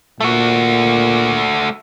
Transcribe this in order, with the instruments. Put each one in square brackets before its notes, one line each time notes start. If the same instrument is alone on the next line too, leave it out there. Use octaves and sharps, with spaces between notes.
[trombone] A#2 [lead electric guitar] A3 F#4